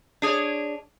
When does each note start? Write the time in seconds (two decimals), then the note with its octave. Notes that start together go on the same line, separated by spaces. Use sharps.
0.22 D4 G#4 C#5